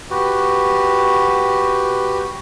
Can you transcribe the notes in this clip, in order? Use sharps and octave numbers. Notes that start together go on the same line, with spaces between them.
F#4 G4 B4